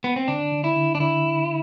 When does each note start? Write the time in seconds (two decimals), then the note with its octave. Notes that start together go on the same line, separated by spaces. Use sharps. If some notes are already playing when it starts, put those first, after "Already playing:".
0.04 B3
0.16 C4
0.28 D3 D4
0.52 D3
0.64 E4
0.77 D3
0.95 D4
1.00 D3 E4
1.24 D3